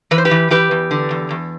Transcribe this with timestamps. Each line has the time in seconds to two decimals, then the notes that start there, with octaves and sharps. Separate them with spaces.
0.11 E3 B4
0.18 C5
0.25 G4 B4
0.31 E3
0.51 E3 G4 B4
0.71 E2
0.91 D3
1.11 E2
1.31 E2